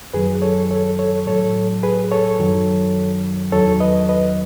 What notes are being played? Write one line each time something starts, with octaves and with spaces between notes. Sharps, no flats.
F#2 D#3 F#3 G#4 B4
A4 C#5
A4 C#5
A4 C#5
A2 F#3 A4 C#5
G#4 B4
A4 C#5
F#2 D#3 F#3
E2 D#3 F#3 A4 C#5
B4 D#5
B4 D#5